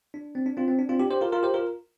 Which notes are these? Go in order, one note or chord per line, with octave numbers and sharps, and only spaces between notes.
D4
C4
D4
C4 F4
C4
D4
C4 F4
D4 G4
G4 C5
F4 A#4
F4 A#4
G4 C5
F4 A#4